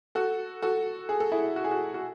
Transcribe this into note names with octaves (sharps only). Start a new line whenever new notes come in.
F#4 A4
F#4 A4
G#4
A4
E4 G#4
F#4
G#4
F#4
F#4